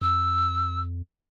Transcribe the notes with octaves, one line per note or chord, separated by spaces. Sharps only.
F2 E6